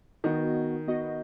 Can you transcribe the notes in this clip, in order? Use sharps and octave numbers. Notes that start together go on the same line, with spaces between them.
D#3 B3 F#4 D#5
B3 F#4 D#5